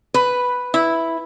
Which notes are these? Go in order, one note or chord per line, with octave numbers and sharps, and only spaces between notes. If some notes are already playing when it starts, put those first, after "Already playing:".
B4
E4